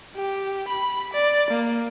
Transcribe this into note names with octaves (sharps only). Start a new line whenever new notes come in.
G4
B5
D5
A#3